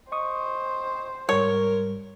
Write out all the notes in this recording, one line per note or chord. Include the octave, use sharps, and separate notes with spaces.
C5 D#5 C#6 D#6
G#2 G3 A#4 C#5